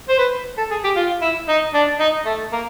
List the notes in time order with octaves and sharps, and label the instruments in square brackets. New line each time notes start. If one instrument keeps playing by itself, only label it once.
[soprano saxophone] C5
B4
A4
G#4
G4
F4
E4
D#4
D4
D#4
A3
A#3